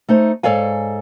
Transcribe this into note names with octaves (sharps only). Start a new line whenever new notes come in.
A3 D#4 C5
G#2 A4 C#5 D5 F5 G#5